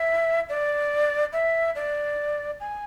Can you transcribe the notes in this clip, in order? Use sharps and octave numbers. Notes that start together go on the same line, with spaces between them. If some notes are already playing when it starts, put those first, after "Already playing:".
Already playing: E5
D5
E5
D5
G#5